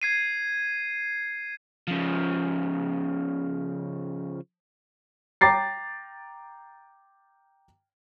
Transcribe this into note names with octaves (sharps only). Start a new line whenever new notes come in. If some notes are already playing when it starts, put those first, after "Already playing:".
G#6 C7 D#7
C#3 F3
G5 A#5 D6 A6 C7